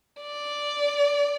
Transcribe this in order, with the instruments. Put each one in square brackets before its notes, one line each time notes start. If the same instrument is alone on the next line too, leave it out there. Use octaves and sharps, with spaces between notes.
[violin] D5